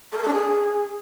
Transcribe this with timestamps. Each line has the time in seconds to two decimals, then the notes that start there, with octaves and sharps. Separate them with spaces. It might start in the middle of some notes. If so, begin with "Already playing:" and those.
0.11 A4
0.17 A#4
0.22 A4
0.27 D4
0.32 G#4